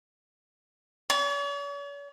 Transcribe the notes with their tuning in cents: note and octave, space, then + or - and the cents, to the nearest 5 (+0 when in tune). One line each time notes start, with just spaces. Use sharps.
C#5 +45